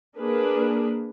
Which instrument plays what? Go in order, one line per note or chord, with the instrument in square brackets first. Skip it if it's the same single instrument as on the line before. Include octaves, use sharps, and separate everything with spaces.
[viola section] A#3 D4 G#4 A#4 B4